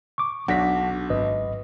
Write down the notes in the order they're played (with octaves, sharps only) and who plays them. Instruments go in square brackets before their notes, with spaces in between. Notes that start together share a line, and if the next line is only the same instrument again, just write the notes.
[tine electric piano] C#6 D6
[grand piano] B1 [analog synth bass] D4 [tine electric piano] F#5 A#6 B6
[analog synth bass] G#1 [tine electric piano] B4 D#5